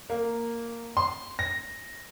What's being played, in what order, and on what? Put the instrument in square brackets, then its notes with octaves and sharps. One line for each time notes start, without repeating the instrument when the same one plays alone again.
[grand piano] A#3
C6
A#6